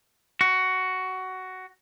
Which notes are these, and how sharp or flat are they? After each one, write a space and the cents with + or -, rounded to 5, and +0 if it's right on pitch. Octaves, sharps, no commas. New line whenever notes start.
F#4 +10